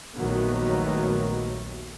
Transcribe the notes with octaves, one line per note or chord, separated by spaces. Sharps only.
A#1 D#2 D#3 F#3 A3 B3